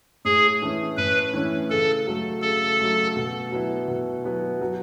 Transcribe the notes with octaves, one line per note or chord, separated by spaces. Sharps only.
A2 G#4
E3 A3 C#4 E4
A2 B4
E3 A3 C#4 E4
C#3 A4
F#3 A3
C#3 A4
F#3 A3
B2
F#3 B3 E4
B2
F#3 B3 E4
F#3